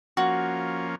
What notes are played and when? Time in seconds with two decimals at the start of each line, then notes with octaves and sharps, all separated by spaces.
0.17 F3 A#3 C#4 F#4